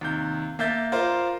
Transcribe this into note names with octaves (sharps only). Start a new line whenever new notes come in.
D#2 C3 G6
A#3 E5 G6 A6
F4 A#4 C5 D5